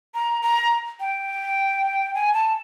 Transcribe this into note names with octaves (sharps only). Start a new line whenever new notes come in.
A#5
A#5
G5
G#5
A5